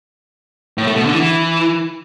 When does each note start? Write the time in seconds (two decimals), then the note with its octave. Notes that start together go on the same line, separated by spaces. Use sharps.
0.78 A2
0.87 A3
0.96 B2
1.05 D3
1.15 E3